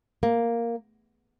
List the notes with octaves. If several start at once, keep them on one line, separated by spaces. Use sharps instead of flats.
A#3